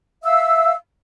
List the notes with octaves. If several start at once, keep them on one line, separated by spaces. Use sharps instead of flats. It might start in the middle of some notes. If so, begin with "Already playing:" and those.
E5 F5 E6